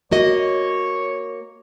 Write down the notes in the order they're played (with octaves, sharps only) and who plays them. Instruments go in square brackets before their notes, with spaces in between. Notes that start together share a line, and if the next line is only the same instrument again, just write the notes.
[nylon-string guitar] A#3 F#4 D#5 [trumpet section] C#5